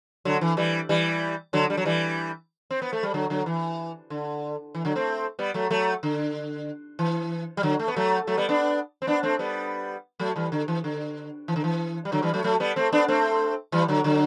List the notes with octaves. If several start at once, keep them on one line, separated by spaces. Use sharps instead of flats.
D3 F#3
E3
E3 G3
E3 G3
D3 F#3
G3
F#3
E3 G3
C4
B3
A3
G3
D3 F#3
D3 F#3
E3
D3
E3
D3 F#3
A3 C4
G3 B3
F#3 A3
F#3 A3
D3
E3
G3
D3 F#3
A3
B3
F#3 A3
F#3 A3
G3 B3
B3 D4
C4
B3 D4
A3 C4
G3 B3
F#3 A3
E3 G3
D3
E3
D3
E3
D3
E3
G3
D3 F#3
E3 G3
F#3 A3
F#3 A3
G3 B3
A3 C4
B3 D4
A3 C4
E3 G3
D3 F#3
D3 F#3